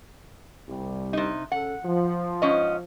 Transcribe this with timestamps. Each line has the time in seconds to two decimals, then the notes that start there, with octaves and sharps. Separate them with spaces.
0.68 C2 G3
1.13 C3 D#4
1.52 C#3 A4 F#5
1.86 F3
2.42 G#2 C#4 D#5